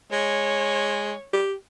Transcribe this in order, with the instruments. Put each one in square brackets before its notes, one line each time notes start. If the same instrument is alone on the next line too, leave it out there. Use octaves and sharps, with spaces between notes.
[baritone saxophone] G#3 [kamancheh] C#5
[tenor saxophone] G4